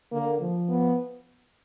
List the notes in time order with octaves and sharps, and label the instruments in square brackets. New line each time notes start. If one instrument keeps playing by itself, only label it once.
[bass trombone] D3 [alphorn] A#3
[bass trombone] F3
[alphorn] B3